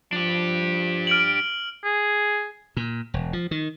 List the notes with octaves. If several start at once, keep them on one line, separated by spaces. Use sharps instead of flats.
F3 D4 G4
F6 D7 F#7
G#4
A#2
E1
F3
D#3